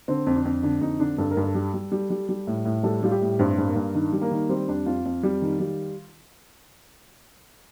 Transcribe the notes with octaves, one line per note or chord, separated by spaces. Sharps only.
D3 C4
F2
D4
F2
D3 D4
F2 D#4
D3 D4
G2 A4
A#4
G2
A4
G3
G3
G3
G3
G3
A2
A2
G3 A4
G3 F4
G4
A2
G2 C4
G2
A#3
G2
D#3 D4
G3
A#3
D#3
G3 C4
F2 D4
F2 F4
F2
G3
D#3
G3